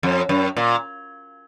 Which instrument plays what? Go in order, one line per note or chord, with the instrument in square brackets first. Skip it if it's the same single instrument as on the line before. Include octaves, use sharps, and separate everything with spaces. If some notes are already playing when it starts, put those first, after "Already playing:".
[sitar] F2
F#2
A#2